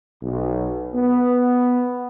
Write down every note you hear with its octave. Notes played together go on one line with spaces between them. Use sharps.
B1
B3